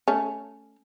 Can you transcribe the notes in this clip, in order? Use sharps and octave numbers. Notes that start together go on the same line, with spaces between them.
A3 C#4